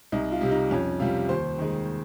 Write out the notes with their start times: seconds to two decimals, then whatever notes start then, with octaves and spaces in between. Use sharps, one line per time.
0.12 C2 D#4
0.32 F4
0.41 C3 G3
0.51 D#4
0.71 F2 C#4
1.00 C3 G3 F4
1.29 D#2 C5
1.58 D#3 G#3